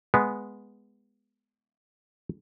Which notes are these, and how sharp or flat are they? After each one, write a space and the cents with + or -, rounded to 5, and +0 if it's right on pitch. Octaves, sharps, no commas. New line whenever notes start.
G#3 +0 B3 +0